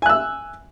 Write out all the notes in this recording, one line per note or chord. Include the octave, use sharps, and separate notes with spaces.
G#5 E6 F#6